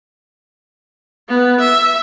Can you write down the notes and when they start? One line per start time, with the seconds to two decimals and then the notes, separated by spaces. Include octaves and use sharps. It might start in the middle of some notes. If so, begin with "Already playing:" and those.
1.29 B3
1.60 E5